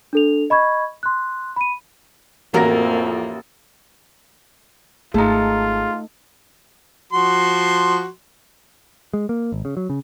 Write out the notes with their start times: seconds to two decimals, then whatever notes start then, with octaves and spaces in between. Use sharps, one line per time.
0.13 D4 A4 F7
0.50 D#5 B5 C#6 G#6
1.03 C6 F#6
1.56 B5 D#7
2.54 A1 F2 A#3 E4 F#4 A#4 A#6
5.14 G#1 A3 D#4 F4 G#4 A5 A#5
7.13 F3 F#4 C6
9.14 G#3
9.29 A#3
9.52 G#1
9.65 C#3
9.77 F#3
9.90 C#3